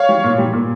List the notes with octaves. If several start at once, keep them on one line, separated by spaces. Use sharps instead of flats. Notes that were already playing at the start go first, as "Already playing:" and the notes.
Already playing: C#5 F5
G3
A#2
G3
A#2